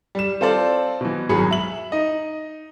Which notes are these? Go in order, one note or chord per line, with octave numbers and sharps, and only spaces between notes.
G3 E7
C4 F4 A4 C5 D5
B2 E3
G#1 F#3 G#4 B5 C#7
E5 F#7
D#4 D#5